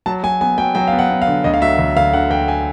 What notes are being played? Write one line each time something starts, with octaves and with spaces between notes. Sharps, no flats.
F#3 A5
F#3 G#5
B3 G#5
F#3 G5
F#3 G5
B3 F5
F#5
B3
F5
D3
D2 D#5
F5
F#3 E5
D2
D2 F5
D3 F#5
D2 G5
G#5